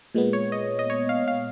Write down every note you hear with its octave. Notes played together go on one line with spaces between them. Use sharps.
A#2 G#3 B3
C#5
D#5
D#5
C#5
F5
F5